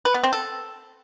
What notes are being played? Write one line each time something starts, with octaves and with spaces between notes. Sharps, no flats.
B4
B3
C4
A4